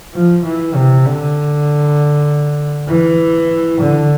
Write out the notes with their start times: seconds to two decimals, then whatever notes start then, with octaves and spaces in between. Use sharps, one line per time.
0.14 F3
0.45 E3
0.75 C3
1.06 D3
2.89 E3
3.80 D3